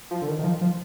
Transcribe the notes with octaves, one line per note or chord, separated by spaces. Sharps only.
F3
D3
D#3
D#3
F3
F3